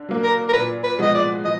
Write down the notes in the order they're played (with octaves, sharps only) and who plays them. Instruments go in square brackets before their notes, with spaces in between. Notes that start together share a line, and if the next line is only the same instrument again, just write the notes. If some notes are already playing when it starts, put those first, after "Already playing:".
Already playing: [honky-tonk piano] D3
F#3 A#3
[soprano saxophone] A#4
A#4
[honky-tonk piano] A#2 [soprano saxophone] B4
[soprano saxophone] B4
[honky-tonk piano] F3 G#3 B3 [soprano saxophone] D#5
[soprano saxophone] D5
[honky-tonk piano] F3 [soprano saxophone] D#5